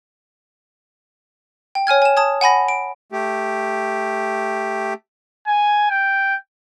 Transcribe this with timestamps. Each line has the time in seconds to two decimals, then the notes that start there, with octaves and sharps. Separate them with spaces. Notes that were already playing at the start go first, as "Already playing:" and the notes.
1.75 G5
1.87 C#5 G#5 F6 G#6
2.02 G#5 E7
2.17 A5 D#6 G#6
2.41 F#5 G#5 B5 A#6
2.68 D7
3.12 A3 G4
5.47 G#5
5.90 G5